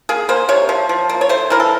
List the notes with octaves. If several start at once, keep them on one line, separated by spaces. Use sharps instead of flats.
A#3 G#4
A#3 C5
C3 C#5
F3
F3
A#3
C#5
A3 C5
E3 A#4
A4